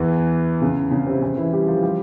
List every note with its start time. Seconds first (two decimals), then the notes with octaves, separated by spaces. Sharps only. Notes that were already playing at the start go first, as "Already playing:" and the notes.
Already playing: E2 E3
0.62 C#3
0.91 C#3 C#4
1.07 C3 C4
1.22 C#3 C#4
1.37 E3 E4
1.52 G3 G4
1.68 F3 F4
1.83 G3 G4